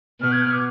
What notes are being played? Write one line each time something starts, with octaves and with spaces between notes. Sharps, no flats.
B2 F6
G#6
F6
D6